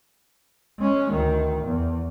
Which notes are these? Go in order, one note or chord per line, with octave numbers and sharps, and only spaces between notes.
G#3 C#4
D2 D#3
E2